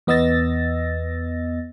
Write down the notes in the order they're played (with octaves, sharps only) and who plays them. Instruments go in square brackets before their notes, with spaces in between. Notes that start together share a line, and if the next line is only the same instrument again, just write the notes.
[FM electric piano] E2 B3 D#5 E6 A6 A#6